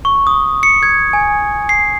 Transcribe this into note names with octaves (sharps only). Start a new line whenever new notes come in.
C#6
D#6
C#7
G#6
G#5
C7